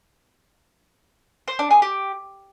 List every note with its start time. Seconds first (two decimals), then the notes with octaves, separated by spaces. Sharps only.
1.48 C5
1.59 D4
1.71 G#4
1.82 G4